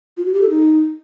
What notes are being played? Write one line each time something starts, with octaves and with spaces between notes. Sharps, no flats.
F4
F#4
G4
A4
D#4